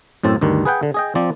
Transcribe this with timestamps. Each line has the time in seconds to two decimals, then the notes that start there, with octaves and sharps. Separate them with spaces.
0.23 F#2 A2 C4 A4 A5
0.41 D2 G2 D#3
0.65 G#4 B4 F#5 G5
0.83 D3
0.94 G#4 D#5 G5
1.15 F3 C4 D5